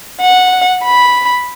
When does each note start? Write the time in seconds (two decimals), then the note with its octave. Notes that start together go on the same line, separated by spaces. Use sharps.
0.21 F#5
0.85 B5